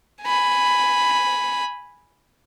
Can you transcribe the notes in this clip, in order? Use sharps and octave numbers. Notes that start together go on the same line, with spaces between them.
G#5 B5